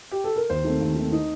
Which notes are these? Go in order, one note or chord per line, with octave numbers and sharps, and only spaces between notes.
G4
A4
A#4
D#2 C5
D#3 A3 C4
D#2
D#3 A3 C4
D#4